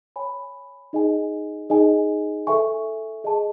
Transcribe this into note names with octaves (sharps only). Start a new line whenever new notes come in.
C#5 G#5 B5
D#4 G#4 D#5 G#5
D#4 G#4 D#5 G#5
A4 E5 G#5 C#6
G#4 D#5 A5